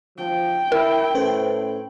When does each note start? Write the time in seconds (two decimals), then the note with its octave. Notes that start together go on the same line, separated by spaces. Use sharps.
0.18 F3 G5
0.72 E4 A#4
1.15 A2 C#4 B4 C5